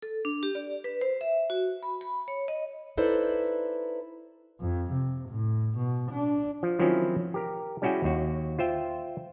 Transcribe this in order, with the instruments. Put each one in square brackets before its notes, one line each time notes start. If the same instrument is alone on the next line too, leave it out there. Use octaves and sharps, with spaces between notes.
[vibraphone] A4
D4
G4
D5
B4
C5
E5
F#4
B5
B5
C#5
D#5
[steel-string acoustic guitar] D#4 E4 A4 B4 C5 D5
[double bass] F2
C3
A2
B2
D4
[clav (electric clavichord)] F3
D#3 F3 F#3 C4 C#4 E4
G4 A#4
G3 C#4 E4 F#4 G#4 G5
D#2 F#4
F4 C5 E5 G5